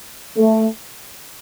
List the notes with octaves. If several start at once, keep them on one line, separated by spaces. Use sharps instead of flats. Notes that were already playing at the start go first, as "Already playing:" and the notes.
A3